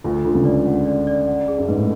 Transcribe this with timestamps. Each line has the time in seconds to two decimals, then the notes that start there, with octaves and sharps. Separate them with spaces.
0.04 D2 D3 F4
0.25 D3 F4
0.35 C#2 C#3
0.45 D5
0.66 F#5
0.86 D5
1.07 D5
1.27 F#5
1.48 G#4
1.58 F#2
1.68 G#2 B4
1.78 A2